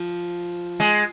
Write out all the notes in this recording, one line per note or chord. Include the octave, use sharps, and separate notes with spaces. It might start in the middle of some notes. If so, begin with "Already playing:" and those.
Already playing: F3
G#3